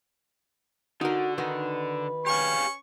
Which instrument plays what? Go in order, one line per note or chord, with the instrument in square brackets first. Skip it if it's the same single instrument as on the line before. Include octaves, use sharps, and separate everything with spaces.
[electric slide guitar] D3 [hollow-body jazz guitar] D#4 A#4 [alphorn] F#4
[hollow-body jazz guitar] D#3 D#4 F#4 [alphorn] B4
[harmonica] C#4 C#6 [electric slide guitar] G4 G#4 F5